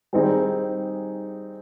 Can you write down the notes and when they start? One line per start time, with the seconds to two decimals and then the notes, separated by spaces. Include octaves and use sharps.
0.13 D#3 G3 C4 D#4 G#4